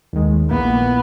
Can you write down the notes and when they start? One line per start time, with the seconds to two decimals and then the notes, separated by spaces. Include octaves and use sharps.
0.13 D#2 D#3 G#3
0.50 A#1 A#2 A#3 B3 E4